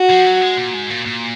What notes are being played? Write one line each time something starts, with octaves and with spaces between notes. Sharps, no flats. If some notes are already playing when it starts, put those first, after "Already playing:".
Already playing: F#4
F3
F#3
G#3
A#2
G#2
A#2
A#2